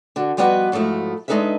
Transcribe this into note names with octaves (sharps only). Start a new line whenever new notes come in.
D3 F#4
F3 G3 B3 F#4 B4 D#5
G#2 F3 F#3 A3 E4
G#3 D4 D#4 A4 B4 E5